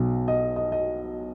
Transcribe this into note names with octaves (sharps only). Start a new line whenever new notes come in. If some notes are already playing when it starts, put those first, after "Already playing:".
Already playing: B1 B2 F#3
D#5
D#5
D#5